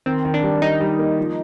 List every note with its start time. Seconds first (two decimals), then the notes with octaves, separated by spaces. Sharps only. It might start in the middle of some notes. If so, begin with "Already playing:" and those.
0.06 D#3 C4
0.25 D#3
0.34 D4
0.43 G3
0.61 G3 D#4
0.80 G3
0.99 A#3
1.18 F3